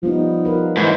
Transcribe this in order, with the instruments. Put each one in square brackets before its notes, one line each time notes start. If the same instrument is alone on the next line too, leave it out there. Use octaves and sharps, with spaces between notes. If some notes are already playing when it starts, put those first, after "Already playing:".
[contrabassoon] F3 [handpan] G3 B3 D#4
[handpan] F4 A#4 B4
[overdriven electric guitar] G#2 E3